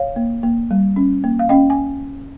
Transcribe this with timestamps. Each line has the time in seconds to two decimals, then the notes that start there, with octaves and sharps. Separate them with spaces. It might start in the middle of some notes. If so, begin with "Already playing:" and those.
Already playing: C#5 F5
0.16 A#3
0.43 A#3
0.71 G3
0.96 C#4
1.24 A#3
1.39 F5
1.49 C#4 D#5 G5
1.70 G#5